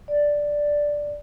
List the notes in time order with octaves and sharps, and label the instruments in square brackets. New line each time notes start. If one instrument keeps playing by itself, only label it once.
[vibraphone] D5